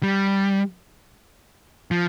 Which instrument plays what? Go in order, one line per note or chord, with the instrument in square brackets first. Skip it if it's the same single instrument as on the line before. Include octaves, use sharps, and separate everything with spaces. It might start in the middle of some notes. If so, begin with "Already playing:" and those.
[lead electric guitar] G3
F3